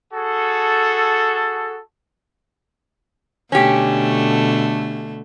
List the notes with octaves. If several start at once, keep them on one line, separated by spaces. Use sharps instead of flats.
F#4 G#4 A4
B2 D3 A3 C#4 G4